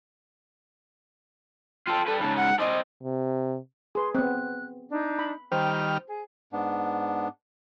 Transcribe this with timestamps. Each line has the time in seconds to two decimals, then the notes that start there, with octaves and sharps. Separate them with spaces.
1.88 F4 A4 G5
2.07 G3 A4 B4
2.21 G#2 C#3 A5
2.37 F#5
2.60 C4 D5 D#5
3.03 C3
3.95 G#4 B4 C6
4.15 B3 C4 F#6
4.89 D4 D#4
5.19 B5
5.52 D#3 G3 C5 G5 A#5 F6
6.08 G#4
6.53 G#2 B3 D4